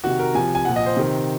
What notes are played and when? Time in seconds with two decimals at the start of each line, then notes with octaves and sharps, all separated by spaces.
0.04 C3 D#3 F#4
0.19 A#4
0.35 C3 F3 G#5
0.55 G#5
0.65 A#2 F3 F#5
0.76 D#5
0.86 C5
0.97 C3 D#3